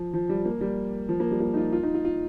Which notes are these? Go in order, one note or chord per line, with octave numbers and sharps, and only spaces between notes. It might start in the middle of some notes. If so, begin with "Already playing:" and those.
Already playing: F3
F3
G3
A#3
G3
F3
A#3
G3
A#3
D#4
F4
F4
D#4
F4
F4